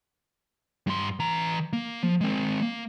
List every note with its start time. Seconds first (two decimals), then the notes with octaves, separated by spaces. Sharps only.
0.87 G2 C6
1.20 E3 A#5
1.73 A#3
2.03 F3
2.21 G#3 C4
2.62 A#3